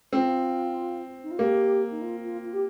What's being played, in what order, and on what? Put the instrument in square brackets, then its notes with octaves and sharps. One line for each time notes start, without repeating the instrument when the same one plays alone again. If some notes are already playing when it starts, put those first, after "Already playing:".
[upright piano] C4 [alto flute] F4
[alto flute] D#4
F4
[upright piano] A#3 [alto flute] G4
[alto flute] D#4
F4
F4
F4
G4